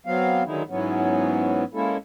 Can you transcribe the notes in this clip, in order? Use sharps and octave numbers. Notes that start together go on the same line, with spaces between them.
F#3 B3 C4 F5
D3 D#3 F#3 G#3 D#4 E4
G#2 E3 F#3 B3 C#4
G#3 A#3 C#4 E4 A4